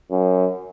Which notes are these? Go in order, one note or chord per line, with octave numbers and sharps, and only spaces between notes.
F#2